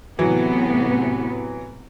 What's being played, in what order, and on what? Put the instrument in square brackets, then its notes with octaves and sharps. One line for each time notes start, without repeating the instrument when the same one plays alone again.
[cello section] A2 C3 B3 [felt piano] E3 F#3